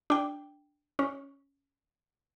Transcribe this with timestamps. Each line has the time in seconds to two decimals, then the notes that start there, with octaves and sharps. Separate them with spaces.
0.10 D4 G5
0.99 C#4